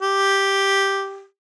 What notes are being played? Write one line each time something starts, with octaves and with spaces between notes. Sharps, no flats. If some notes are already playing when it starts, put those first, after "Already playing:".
G4